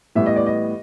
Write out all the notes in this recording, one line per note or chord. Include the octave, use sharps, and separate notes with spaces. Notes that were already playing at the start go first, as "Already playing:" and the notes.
A2 E3 G3 B3 E5
D#5
D5
D#5